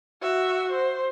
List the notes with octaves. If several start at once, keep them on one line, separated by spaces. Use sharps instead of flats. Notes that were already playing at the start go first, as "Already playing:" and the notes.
F#4 E5
C5